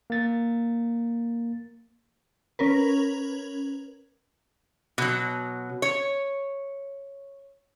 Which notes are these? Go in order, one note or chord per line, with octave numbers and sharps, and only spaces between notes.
A#3 A6
C#4 A#4 B4
B2 F#3
C#5